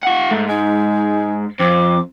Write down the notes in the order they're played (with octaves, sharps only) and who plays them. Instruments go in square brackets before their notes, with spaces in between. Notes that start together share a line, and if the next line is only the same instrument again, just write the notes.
[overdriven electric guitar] F4 F#5
[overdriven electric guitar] G#2 [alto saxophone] A3
[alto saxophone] G#3 [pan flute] D#4
[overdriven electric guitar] F2 [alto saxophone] C4 [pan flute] D6